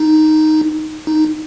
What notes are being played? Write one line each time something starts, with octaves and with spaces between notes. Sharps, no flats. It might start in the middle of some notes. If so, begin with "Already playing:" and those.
Already playing: D#4
D#4